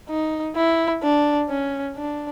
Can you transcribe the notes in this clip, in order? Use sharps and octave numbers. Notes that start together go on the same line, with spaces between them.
D#4
E4
D4
C#4
D4